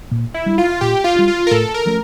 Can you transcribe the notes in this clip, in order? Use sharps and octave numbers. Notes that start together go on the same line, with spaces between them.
A#2
E4
G3 D4
F4
A#2 G4
F4
G3 D4
F4
A#4
A2 A4
A#4
F3 A3 C#4